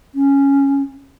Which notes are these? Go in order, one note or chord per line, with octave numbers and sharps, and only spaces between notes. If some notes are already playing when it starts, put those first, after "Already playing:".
C#4